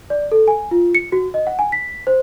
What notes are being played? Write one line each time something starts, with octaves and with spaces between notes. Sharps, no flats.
D5
A4
G#5
F4
C#7
F#4
D#5
F#5
G#5
B6
C5